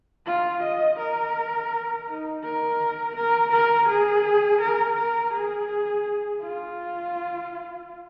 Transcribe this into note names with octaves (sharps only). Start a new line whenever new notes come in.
F4
D#5
A#4
D#4
A#4
A#4
A#4
G#4
A#4
A#4
G#4
F4